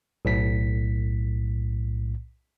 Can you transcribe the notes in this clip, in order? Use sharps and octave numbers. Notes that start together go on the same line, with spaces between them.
B1 A2 B6